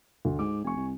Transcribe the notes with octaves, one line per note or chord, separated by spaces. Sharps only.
D2
G#2 D6
F1 G#5 C#6
C2